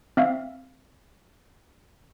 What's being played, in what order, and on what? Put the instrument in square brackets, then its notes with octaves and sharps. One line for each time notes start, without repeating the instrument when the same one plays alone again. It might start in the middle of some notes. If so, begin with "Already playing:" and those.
[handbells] C4 E5 F5